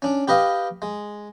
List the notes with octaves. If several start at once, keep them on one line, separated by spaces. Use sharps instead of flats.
C#4 D4
G4 B4 D#5 F5
G#3